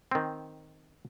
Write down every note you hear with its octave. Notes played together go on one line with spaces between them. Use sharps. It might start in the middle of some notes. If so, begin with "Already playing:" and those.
D#3 C4